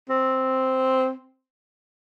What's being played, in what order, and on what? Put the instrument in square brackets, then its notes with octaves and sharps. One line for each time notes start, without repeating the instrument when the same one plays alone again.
[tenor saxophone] C4